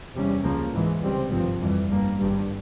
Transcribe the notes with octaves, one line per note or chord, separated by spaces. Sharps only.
E2 C3 G3 C#4
C#2 C#3 F3 A#3
G#2 E3 G#3
C#2 C3 G3 C4
G#1 G2 F3 C4
F2 E3 G3
G1 G2 G3 A#3
G#1 G2 G3